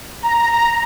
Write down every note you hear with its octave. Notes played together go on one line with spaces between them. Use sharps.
A#5